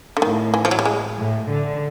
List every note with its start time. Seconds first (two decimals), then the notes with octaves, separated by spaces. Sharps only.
0.17 D3
0.22 A2 D#3
0.54 E3
0.65 F3
0.71 F#3
0.79 G3
0.85 G#3
1.18 A2
1.50 D3